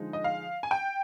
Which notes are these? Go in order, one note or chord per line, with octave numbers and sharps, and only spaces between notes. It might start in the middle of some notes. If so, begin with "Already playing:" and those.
Already playing: D3 F3 G#3 D#4
D#5
F5
G#5
G5